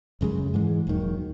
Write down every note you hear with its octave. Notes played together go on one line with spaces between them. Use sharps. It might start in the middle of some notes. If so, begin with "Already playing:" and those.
F#1 F#2 C#3 G#3
G#2 E3 G#3
E1 D#2 D#3 F#3